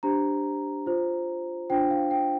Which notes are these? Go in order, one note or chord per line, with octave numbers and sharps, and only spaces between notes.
D4 G4 C5 A#5
F4 C5
D4 F4 C5 G5
F5
G5